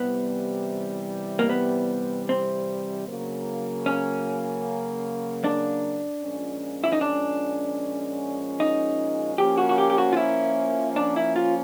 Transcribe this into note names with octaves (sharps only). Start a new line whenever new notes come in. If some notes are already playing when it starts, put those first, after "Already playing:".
Already playing: C3 E3 G3 B3
A#3
B3
C4
C#3 F#3 A#3
C#4
D4
A#2 F3 G#3 C#4
E4
D#4
D4
D#4
F3 A#3 C#4 G4
F#4
F#4
G4
G4
F#4
F4
E4
D4
E4
F4